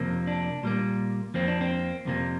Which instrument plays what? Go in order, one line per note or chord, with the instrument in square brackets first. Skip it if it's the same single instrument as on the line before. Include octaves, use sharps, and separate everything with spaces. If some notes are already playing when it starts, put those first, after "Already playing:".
Already playing: [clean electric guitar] F2 C3 F3 A#3
D4
A#2 G3 A#3
F2 F3 A#3 C4
D4
C4
F2 C3 F3 A#3